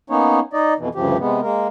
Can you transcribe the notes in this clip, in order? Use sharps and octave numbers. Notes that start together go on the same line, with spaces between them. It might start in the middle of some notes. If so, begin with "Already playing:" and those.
A#3 B3 C#4 D#4 C#5
D#4 D5 D#5
F2 B2 E3
D2 G2 C#3 F3 G4
C3 G#3 B3
G#3 A#3 A#4